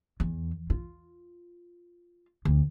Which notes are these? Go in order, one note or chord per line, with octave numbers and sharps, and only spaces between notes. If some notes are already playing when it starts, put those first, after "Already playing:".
E2
F4
D2